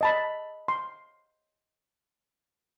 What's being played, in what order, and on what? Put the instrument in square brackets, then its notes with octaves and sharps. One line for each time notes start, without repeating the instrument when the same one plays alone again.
[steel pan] D#5 A5 B5
C6